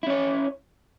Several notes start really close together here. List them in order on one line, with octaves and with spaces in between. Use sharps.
E4 C#4 C#5